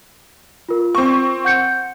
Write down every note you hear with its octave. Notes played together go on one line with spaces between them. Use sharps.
F4 A#4
C4 C#6
F#5 G6 C#7